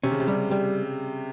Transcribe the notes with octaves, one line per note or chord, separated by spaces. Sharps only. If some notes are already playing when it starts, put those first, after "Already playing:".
C3 C#4
C#3
C3
G3
G3